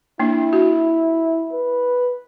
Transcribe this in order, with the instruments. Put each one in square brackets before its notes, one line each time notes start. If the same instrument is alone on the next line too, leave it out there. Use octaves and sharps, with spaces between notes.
[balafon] A#3 D4 [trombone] E4
[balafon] F#4
[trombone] B4